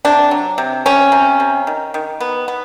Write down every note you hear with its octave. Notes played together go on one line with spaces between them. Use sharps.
C3 D4
F#3
C3
C3 C#4
C3
C3
D#3
D#3
B3
B3